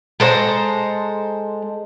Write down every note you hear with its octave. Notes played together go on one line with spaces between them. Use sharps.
G#3 A4 C5 A#5